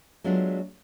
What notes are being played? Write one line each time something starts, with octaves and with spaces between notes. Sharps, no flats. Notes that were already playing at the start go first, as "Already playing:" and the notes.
F#3 G#3 A3 B3 D4 F4